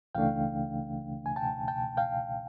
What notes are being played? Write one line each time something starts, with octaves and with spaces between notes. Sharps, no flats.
C#2 C#3 E3 A3 D4 F5 G5
G#5
G5 A5
G5 A5
F5 G5